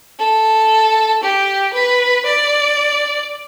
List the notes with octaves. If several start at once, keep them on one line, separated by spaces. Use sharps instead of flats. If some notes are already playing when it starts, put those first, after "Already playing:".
A4
G4
B4
D5